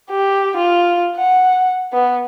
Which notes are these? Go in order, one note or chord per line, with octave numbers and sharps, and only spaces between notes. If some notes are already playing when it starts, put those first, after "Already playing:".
G4
F4
F#5
B3